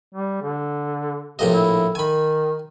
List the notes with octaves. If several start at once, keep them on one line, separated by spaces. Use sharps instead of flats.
G3
D3
A#1 A2 C3 D#5
E4
D#3 G#5 B5